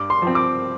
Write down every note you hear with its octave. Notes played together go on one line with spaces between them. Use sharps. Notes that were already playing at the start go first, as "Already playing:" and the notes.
Already playing: G2 D6
C6
F3 C4
D6